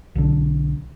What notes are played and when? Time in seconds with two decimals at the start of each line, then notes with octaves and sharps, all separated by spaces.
0.15 B1 D3